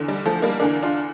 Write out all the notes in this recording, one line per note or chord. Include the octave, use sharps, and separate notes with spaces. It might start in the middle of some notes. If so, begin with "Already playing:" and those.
Already playing: E2 D3
G3
F3 A3
G3 A#3
E2 D3 A#3 D4
D4 F4